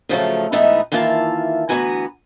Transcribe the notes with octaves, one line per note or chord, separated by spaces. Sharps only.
C#3 F3 F#3 A3
G#2 E3 A3 B3 D#4 E5
D#3 E3 A#3 F4 E5 A5
D2 E3 B3 F#4 G#5 A#5